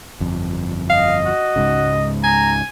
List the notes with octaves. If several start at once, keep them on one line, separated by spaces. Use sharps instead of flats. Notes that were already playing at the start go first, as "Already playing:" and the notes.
G1 F2
D#5 F5
F#4
C#2 G#2 C#3
G#5 A#5